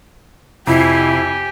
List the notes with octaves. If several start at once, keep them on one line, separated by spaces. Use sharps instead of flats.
F2 C3 E4 G4 G#5 C7